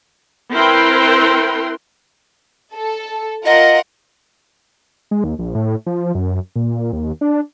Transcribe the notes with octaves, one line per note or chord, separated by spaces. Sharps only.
C4 E4 A#4 B4 G5 C6
A4
F4 A#4 D#5 F#5
G#3
D#2
A#1
A2
F3
F#2
A#2
D#2
D4